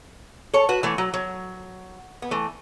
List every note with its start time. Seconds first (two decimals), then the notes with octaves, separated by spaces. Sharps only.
0.54 A4 C#5
0.69 F#4 B4
0.83 E3 A3
0.98 F#3
1.14 F#3
2.22 B3
2.31 E3 A3